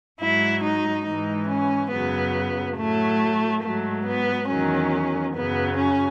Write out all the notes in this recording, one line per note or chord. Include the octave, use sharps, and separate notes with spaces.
G#2 F#3 E4
D#4
G#2 E3 D#4
C#4
F#2 C#3 F#3 B3
A2 F#3 A3
G#2 F#3 A3
B3
E2 D#3 F#3 C#4
F#2 C#3 F#3 B3
C#4